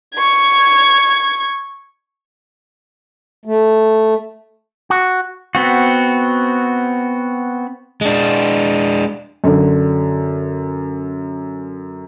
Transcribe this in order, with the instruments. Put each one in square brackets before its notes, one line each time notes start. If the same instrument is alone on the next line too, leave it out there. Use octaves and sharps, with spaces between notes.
[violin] C#6 G#6
[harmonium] A3
[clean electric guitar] F#4
[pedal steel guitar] B3 C4 F#4
[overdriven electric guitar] G#3 D4
[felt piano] F#2 D3